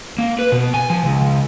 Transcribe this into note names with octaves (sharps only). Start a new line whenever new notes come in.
A#3
B4
B2
G#5
F3
C#2